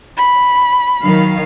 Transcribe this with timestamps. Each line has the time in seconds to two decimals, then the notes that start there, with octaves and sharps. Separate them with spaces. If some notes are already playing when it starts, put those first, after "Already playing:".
0.17 B5
1.02 D#3 F#3 F5